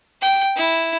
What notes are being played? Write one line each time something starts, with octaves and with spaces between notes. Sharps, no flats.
G5
E4